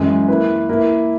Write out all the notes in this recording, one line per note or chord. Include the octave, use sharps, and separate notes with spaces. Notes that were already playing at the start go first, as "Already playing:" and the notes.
Already playing: F#2 E3 G#3
A#3 E4 B4
A#3 E4 A#4